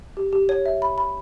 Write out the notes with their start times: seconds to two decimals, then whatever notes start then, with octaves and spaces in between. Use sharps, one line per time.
0.17 G4
0.33 G4
0.49 C#5
0.66 E5
0.82 B5
0.98 B5